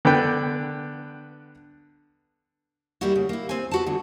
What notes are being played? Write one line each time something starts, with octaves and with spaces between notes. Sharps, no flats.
D3 B3 D4 B4 G5
G3 A#3 E4 F#4
C#3
A#3 E4
C4 G#5
B3 F#4 A5
E2 G2 D3